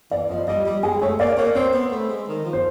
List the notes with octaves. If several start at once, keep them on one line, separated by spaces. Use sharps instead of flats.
E3 D5
F3 D#5
G3 D#5
G3
G#3 G#4
A3 C#5
A#3 D5
A#3 C#5
C4 C5
B3
A3
G#3
D#3
F3
C5